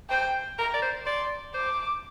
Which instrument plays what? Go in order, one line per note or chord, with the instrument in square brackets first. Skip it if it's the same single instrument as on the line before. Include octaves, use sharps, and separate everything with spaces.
[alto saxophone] C5 [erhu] G5
[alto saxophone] A#4 [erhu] A#5
[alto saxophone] D5
C5
[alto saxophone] D5 [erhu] C6
[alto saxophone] C5 [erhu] D6